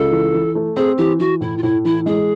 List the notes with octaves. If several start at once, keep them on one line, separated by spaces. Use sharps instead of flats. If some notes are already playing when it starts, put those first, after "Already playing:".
Already playing: C#2 A4
E3
E3
A3
C4 G#4
E3 G4
E3 F#4
A2 E4
F4
A2 E4
E3 E4
G#3 G#4